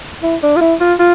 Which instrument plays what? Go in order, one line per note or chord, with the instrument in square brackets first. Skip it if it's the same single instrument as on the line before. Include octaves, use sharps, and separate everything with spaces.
[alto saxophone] E4
D4
F4
E4
F4
F4